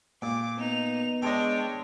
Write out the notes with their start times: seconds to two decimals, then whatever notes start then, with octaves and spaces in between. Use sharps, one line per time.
0.22 A#2 D6
0.58 B3 D#4 F7
1.22 G#3 D4 A4 C#5 D#5 G5